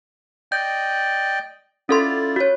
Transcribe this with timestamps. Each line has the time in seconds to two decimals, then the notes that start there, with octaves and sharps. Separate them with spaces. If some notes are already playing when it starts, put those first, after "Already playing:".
0.52 D5 D#5 G5 G6
1.89 C#4 E4 F4 A4 D5 C6
2.36 F#4 C#5